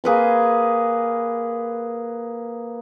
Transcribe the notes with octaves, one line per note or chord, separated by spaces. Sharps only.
A#3 G#4 B4 C6